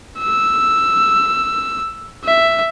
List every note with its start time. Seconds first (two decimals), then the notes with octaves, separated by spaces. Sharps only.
0.20 E6
2.24 E5